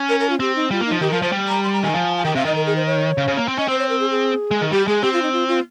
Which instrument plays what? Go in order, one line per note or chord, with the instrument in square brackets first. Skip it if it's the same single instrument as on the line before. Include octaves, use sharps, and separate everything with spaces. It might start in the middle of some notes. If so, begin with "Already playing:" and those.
Already playing: [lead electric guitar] C#4
[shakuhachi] A#4
A#4
F4
[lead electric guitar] C4 [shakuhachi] G4
[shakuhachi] D#4
[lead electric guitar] G3 [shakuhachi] F4
[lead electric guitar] A#3
[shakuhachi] D#4
[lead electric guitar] F3
[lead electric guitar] D#3 [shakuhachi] G4
[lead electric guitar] F3 [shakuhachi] A#4
[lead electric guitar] F3 [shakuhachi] C5
[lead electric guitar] G3
[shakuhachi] A#5
C6
A#5
[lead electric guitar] D#3 [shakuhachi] G#5
[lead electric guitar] F3
[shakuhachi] G#5
[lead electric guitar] D#3 [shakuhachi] G5
[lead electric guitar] C3 [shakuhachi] F5
[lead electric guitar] D#3 [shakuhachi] D#5
[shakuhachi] A#4
G#4
C5
C#5
[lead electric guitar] C#3
C#3
A#3
C4
[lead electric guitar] C#4 [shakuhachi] D#5
[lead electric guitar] C4 [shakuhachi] C5
[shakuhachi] C#5
A#4
G#4
G#4
[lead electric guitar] G#3
D#3
[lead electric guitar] G3 [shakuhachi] G4
[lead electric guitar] G#3 [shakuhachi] G#4
[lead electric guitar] C4 [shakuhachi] G4
[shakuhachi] F4
D#4
F4
F4